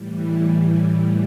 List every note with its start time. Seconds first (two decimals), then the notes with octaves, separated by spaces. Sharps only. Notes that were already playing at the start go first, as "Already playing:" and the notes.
Already playing: A2 E3 G3
0.28 A5
0.64 G#5